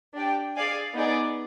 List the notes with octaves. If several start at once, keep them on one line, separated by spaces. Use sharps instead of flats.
D4 G4 D5 G5
G#4 D5 F5 G#5
B3 D#4 G#4 D5